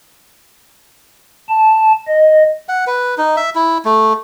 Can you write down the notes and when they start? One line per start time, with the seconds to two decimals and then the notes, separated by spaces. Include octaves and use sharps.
1.49 A5
2.07 D#5
2.69 F#5
2.87 B4
3.18 D#4
3.37 E5
3.55 E4
3.85 A3